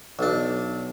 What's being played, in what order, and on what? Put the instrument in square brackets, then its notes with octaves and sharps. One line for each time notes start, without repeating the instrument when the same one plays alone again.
[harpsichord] B1 D4